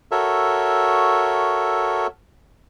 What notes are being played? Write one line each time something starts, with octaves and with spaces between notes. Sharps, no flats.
F#4 A4 A#4 C#5 E5